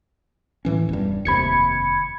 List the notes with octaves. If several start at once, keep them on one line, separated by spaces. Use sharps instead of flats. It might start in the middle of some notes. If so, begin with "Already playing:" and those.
A2 E3 C#4
E1 G2
F1 D#2 C3 B5 G#6 C#7